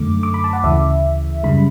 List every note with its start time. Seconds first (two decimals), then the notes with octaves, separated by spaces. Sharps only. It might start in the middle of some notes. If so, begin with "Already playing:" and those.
Already playing: F#2 D3 A3 D6
0.23 D6
0.34 B5
0.44 A5
0.53 F#5
0.63 D2 C#3 E3 E5
1.43 F#2 C#3 G3 B5